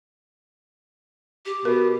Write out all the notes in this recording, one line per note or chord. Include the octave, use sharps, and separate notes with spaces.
G4
B2 A#4